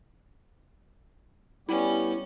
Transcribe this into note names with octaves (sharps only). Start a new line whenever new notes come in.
G3 B3 C#4 E4 G4